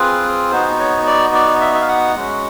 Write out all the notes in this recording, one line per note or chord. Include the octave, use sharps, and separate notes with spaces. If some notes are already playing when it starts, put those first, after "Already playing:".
Already playing: C4 F4 G#4 B4
B3 D#4 F#4 C5
C#5
D5
D5
E5
E5
F5
F#5
G#3 C#4 F#4